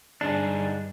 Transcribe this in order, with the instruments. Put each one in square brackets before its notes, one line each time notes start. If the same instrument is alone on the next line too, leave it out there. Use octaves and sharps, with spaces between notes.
[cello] G2 [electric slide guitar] D3 D#4 G#4 [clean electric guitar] D4